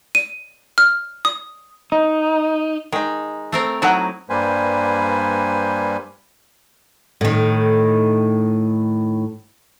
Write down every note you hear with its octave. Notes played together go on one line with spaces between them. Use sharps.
D#7
F6
D#6
D#4
D#3 G#3 D#4
A3 C4 A#4
F#3 D#4 E4 F#5 A5
G2 G3 A#3 B4 C5 G#5
A2 D#3